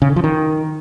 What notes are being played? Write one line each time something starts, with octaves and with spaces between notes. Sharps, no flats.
C#3
D3
F3
D#3